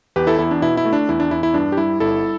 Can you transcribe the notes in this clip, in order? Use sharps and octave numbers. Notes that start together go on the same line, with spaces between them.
E2 G4 B4
E4 A4
E2 E4
D4
B2 E4
E4
A3
D4
E2 E4
D4
E2 E4
E4
G2 D4
G4
G3 E4
G1 E4 A4